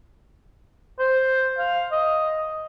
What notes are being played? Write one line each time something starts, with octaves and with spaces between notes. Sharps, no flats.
C5
F5
D#5